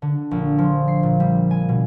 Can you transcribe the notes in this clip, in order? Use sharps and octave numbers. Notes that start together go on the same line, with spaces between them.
D3
A#1
F3
C7
A#2
G3
G#5
B2